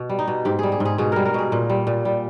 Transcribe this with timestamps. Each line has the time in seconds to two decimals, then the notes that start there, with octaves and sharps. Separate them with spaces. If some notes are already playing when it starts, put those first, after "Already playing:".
Already playing: B2
0.10 G3
0.19 D#4
0.28 B2
0.45 G#2 G4
0.59 G3 G#4
0.72 G#4
0.80 G#2
0.85 G#4
0.98 B2 G#4
1.12 G3 A#4
1.25 A#4
1.34 B2 G#4
1.52 A#2
1.70 G3
1.87 A#2
2.05 G3